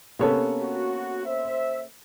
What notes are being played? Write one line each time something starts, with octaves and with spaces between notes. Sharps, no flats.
C3 A#3 B3 C#4 A4 C#5
F#4
C5 E5